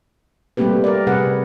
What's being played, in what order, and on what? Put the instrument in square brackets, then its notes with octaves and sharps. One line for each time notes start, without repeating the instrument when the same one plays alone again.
[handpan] G3 A3 A#3 C4 G4 B4
A#4 D5
C3 G3 G#4 B4 F#5